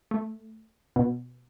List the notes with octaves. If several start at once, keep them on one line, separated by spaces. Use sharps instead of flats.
A3
B2